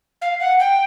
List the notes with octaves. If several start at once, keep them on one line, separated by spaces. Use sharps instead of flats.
F5
F#5
G5